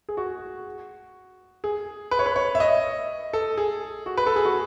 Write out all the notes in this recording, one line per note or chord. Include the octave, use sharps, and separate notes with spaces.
G#4
F#4
G#4
B4
C#5
B4
C#5
E5
D#5
A4
G#4
F#4
B4
A4
G#4
F#4